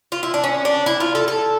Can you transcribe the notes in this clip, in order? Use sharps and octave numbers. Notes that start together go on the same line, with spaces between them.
F4
E4
D4
C#4
D4
E4
F4
A4
A4